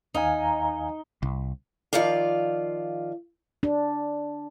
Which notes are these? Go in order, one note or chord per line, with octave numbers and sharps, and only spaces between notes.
D#2 D#4 F5 G#5
C2
D#3 F3 F4 D5 F5
D4